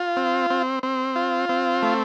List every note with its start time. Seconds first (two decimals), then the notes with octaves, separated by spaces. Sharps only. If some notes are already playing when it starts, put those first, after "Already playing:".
Already playing: F4
0.17 C4
0.50 C4
0.83 C4
1.16 F4
1.49 C4
1.83 A3